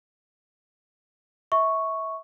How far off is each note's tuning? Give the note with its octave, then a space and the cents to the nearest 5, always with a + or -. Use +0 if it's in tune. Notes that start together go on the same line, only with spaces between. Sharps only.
E5 -25 C#6 +0